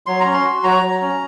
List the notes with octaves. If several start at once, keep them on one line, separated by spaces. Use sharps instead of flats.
F#3 C6
A#5
C#4
C6
F#4
F#3 A#5
F#3
C#4